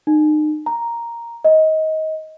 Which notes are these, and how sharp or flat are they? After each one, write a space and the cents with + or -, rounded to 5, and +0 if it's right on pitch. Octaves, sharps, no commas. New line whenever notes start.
D#4 -35
A#5 +0
D#5 +20